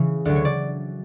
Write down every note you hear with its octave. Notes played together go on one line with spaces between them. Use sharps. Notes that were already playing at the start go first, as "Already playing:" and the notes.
Already playing: C#3 E3
D2 D3 F#3 D5
C#5
D5